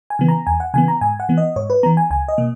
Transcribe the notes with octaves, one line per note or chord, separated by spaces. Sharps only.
G#5
C#3 E3 B3
A#5
E2 G#5
F#5
C#3 E3 B3 G#5
A#5
G#2 G#5
F#5
E3 B3
D#5
G#2 C#5
B4
E3 B3 A#5
G#5
C#2 G#5
D#5
B2 A#3